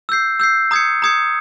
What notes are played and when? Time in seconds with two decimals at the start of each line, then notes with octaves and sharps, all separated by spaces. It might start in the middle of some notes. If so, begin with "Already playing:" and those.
0.09 E6 G6 C7
0.40 E6 G6 C7
0.71 A#5 D#6 G#6 C#7
1.02 A#5 D#6 G#6 C#7